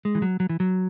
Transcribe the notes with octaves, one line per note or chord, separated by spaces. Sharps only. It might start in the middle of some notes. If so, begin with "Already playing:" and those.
G#3
E3
F#3
F#3
E3
F#3